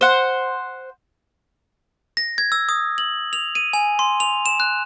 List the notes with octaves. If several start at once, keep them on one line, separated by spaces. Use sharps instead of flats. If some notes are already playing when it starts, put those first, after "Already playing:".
C5 F#5
A#6
G#6
E6
D#6
F#7
F7
D#7
G#5
C6
F7
E7
F#6